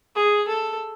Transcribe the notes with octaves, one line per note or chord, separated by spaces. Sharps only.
G#4
A4